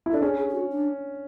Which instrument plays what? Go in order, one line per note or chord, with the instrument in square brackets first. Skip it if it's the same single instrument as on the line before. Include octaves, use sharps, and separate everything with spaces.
[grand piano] E4
[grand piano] D4 [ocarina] A4
[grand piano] C#4 [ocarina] G#4
[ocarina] G#4
G#4
F#4
D4